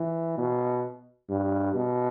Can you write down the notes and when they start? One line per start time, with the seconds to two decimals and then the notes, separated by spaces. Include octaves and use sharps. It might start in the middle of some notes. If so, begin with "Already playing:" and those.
Already playing: E3
0.38 B2
1.30 G2
1.75 B2